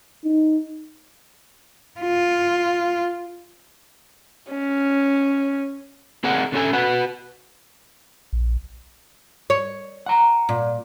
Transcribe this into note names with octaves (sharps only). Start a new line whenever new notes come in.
D#4
F4
C#4
C4 G#4 A#4 F#5
D3 C#4 A4 G#5
F#4 B4 F#5
A#1
C#5
F#5 A#5
A#2